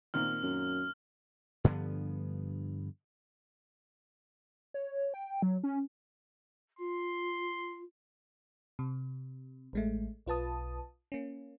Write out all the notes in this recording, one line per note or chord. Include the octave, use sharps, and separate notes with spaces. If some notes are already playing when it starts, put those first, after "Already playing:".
A#2 D#3 C4 F6
F#2
G2 D3 F3 B3
C#5
G5
F#3
C#4
F4 C6
C3
A1 G#3 A3
B1 F4 B4 A5 D#6
A#3 C#4